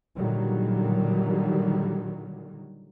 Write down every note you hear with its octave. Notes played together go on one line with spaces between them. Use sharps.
A#2 D3 D#3 F#3 G3